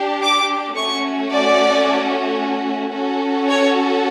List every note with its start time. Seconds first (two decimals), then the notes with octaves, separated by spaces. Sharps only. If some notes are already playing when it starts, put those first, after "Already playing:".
Already playing: D4 G4
0.23 D6
0.76 A3 C#4 F#4 C#6
1.30 D5
2.93 C#4 F#4 A4
3.48 C#5